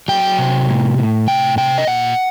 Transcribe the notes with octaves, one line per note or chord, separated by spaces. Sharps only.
F#3 G5
C3
A2
A2
C3 G5
C3 G5
D#5
A#2 F#5